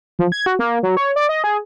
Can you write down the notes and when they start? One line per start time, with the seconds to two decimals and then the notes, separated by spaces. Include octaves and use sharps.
0.19 F3
0.32 G#6
0.46 F#4
0.59 A#3
0.83 F#3
0.97 C#5
1.16 D5
1.29 D#5
1.44 G#4